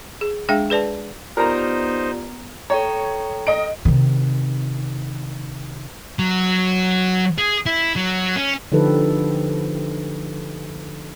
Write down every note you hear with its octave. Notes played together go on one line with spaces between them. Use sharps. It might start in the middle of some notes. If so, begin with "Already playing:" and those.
G#4
G#3 D4 G#4 F5 G5
G#4 B4 D5 A5
B3 D#4 F4 G4 A#4 C5 D5 A#5
A4 C#5 G5 A#5
D#5 D7
C3 D#3
F#3
G#4
E4
F#3
C#4
D3 F3 D#4 G4 A4 B4